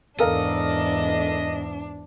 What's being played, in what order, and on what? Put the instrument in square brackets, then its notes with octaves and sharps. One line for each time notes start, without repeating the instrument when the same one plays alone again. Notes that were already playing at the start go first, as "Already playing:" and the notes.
[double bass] E2 G#2 [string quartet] D4 [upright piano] A4 A#4 F5 [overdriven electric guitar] D#5